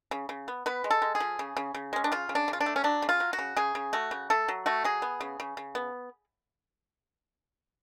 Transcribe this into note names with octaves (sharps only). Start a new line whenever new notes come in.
C#3
C#3
B3
B3 B4
G#3
A4
G#3
G#4
F3
C#3
C#3
C#3
G#3 C#4
D4
C#3 F4
C#3
D4
C#3
F4
D4
A3
C#4
F#3 D4
C#3
F4
F#3
F#4
C#3
C#3 G#4
C#3
A3 F#4
C#3
A3 A4
F#3
A3 F#4
F#3 G#4
B3
C#3
C#3
C#3
B3